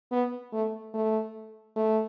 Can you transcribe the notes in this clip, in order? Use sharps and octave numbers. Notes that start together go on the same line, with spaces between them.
B3
A3
A3
A3